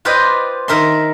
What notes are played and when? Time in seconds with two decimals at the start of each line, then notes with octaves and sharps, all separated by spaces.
0.05 F4 B4 C5 D5 D#5 G5
0.68 D#3 A#4 E5 C6